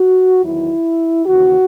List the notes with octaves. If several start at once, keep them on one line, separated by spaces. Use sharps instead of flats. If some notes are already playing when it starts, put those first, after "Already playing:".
Already playing: F#4
E2 D#3 F#3 E4
D#2 C#3 E3 F#4